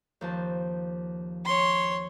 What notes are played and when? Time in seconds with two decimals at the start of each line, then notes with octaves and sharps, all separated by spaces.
0.21 D#2 F3 A5
1.45 C#5 C6